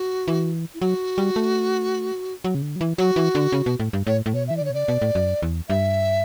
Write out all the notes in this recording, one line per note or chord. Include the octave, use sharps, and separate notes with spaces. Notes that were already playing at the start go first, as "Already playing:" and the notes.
Already playing: F#4
E3
E4
F#3 F#4
G3
A3
F#3
C#3
D3
F#3
E3
F#3 F#4
E3
D3
C#3
B2
A2
G2
A2 C#5
A2
B2 C#5
E3 E5
D5
D3 C#5
B2
C#3 D5
B2
A2
F#2
E2
G2 E5